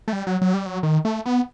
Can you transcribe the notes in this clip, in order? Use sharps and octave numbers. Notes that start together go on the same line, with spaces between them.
A3
G3
F#3
F#3
G3
F#3
D#3
A3
B3